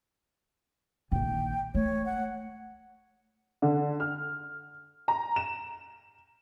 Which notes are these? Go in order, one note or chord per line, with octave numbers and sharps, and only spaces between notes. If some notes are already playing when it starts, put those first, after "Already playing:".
A#1 D#3 G5
A3 C#5
F#5
D3
F6
A#5
E7